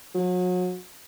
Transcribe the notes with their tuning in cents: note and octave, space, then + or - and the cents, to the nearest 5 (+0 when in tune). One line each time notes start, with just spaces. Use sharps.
F#3 -35